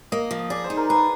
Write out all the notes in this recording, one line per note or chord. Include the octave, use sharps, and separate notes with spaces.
A#3 D#5
F3
G#4 D5
C5
D#4
A#4
G#4 B4